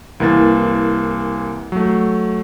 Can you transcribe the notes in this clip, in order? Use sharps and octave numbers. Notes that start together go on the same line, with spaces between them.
C2 E3 A#3 A6
F#3 A3